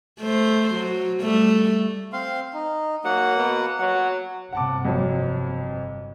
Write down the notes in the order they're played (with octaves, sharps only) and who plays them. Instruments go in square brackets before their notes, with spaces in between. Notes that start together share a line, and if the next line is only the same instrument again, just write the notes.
[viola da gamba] A3 C5
F#3
G3 A3
[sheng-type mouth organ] C4 F5 C6
D#4
[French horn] F#3 [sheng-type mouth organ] A#3 F#5
[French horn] B2
[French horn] F#3 [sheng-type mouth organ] F#5
[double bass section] G1 C3 [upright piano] F#5 A5 D6
[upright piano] F2 F#3